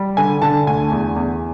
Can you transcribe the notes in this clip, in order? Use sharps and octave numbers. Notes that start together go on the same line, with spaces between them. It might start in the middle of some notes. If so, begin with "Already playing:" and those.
Already playing: G3
D3 G#5
D3 A5
D2 G#5
E2
E2